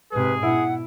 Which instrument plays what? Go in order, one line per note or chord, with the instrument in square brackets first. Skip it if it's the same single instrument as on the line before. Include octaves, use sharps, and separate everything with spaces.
[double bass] G#2 C3 [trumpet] G#4 [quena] B4
[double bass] B2 [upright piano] E4 [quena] F#5